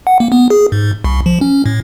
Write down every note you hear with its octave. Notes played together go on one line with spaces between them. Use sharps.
F#5
A#3
B3
G#4
G#2
C2
F3
C#4
A2